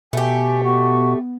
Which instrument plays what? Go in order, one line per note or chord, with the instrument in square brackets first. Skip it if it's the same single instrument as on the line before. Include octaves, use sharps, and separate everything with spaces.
[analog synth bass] B2 [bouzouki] A3 G4 [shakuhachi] G#5
[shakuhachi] B3 [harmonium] F#4